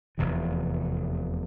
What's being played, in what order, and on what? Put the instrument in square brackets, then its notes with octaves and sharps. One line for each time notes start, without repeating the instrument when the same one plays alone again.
[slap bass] F1 E2 C3 E3